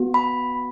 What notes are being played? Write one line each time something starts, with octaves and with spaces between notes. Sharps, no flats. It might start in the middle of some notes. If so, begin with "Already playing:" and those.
Already playing: B3 F#4
B5